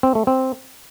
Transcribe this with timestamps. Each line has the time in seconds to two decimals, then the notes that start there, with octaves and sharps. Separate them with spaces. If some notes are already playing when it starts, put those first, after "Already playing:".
0.03 C4
0.15 A3
0.27 C4